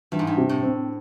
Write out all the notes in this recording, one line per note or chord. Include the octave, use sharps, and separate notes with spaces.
G2 E3
G#2
G2
C3
A2
C4